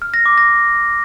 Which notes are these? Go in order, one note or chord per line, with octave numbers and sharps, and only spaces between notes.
F6
A#6
D6
A#6